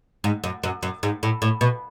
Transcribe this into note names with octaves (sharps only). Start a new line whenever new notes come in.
G#2
F#2
F#2
F#2
G#2
A2
A2
B2